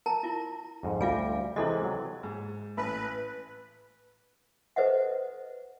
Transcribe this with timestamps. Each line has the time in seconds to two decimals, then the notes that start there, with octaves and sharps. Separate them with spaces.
0.06 A#4 A5 A#5
0.23 E4 F4
0.83 F2 G#2
1.01 D2 G3 F4 F5 G#5
1.56 C3 E3 G#3 E4 A4 D#5
1.84 F#3
2.23 G#2
2.77 A1 B4
4.76 A4 B4 C5 D#5 E5 F#5